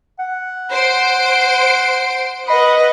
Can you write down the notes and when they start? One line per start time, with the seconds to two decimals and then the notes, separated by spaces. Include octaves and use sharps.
0.19 F#5
0.70 C5 C6 D7
2.48 B4 D#5 F#5 B5